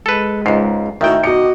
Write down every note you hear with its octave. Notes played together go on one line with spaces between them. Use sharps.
G#3 A4 B4
C#2 G#2 C7
A2 D#3 F#4 E5 G5
B2 F#4 D5 D#5 C#7